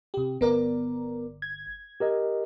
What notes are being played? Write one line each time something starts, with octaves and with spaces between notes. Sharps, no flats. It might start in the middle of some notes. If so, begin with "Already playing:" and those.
C3 G4
G1 B3 A#4 D5
G#6
G4 A#4 D#5